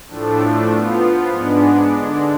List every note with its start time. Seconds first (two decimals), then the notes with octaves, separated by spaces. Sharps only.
0.08 A2 F3 A3 D4
0.70 F3 B3 F4
1.30 G#2 G#3 B3 D4
1.91 D3 G#3 D4